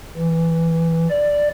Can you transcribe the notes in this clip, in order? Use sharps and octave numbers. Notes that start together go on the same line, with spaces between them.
E3
D5